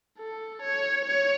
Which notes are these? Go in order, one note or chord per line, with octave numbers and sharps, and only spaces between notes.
A4
C#5
C#5